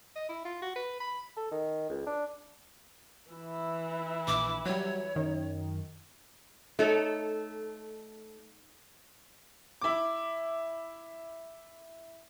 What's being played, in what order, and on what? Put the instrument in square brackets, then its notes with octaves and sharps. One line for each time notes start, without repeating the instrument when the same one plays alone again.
[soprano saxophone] D#5
E4
F4
F#4
B4
B5
[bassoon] A4
D#3
C#2
D4
[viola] E3 E4
[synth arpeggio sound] A#1 [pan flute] D6
[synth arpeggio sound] F#3 G3 [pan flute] C#5
[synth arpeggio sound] F#2 D#3
[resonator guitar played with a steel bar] A3 [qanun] D#4 A4 C#5
[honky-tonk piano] E4 D6